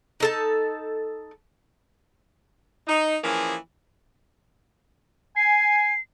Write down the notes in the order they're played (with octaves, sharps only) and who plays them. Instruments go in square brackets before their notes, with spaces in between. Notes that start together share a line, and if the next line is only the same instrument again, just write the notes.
[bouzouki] D#4 A4 A5
[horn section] D#4
E3 F3 A#3 C#4 G#4
[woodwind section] G#5 [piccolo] C7